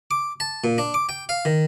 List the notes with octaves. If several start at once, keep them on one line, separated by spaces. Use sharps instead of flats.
D6
A5
A#2
D4
D6
G5
F5
D#3